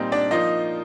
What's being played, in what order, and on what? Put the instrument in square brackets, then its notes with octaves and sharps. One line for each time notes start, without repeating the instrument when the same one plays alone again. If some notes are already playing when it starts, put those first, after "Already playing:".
Already playing: [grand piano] A#2 G3 C4 D#4
D4 D5
F3 A#3 D#4 F4 D#5